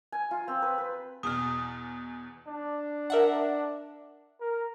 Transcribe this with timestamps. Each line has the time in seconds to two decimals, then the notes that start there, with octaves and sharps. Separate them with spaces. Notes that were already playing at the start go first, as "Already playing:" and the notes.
0.12 G#5
0.31 F4
0.48 C4
0.62 B4
0.78 B4
1.23 E2 B2 D#6 F6
2.47 D4
3.10 A#4 E5 F#5
4.40 A#4